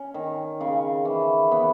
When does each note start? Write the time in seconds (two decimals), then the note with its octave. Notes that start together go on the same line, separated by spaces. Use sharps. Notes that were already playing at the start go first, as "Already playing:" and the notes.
Already playing: C#4
0.14 D#3
0.61 C#3
1.05 E3
1.51 B3